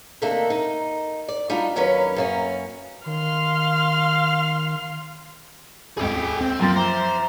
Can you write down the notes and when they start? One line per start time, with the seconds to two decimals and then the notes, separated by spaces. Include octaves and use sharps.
0.22 C3 D#3 A3 A#3 D4 A4
0.50 D#4
1.28 D5
1.50 G3 D4 D#4 F4 F#4
1.76 D#2 F#3 C#4 A#4 B4 C#5
2.16 F#2 A#3 C#4
3.06 D#3 F5 C6 F6
5.97 D#1 G#1 C#2 G#4 G5
6.41 C4
6.61 F#2 F3 A#3 G5 C6 A6
6.76 C5 E5 A#5 D6